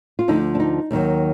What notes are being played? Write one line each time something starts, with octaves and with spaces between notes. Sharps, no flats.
F4
D2 D3 F3 D#4
D4
D#4
D#2 D#3 F#3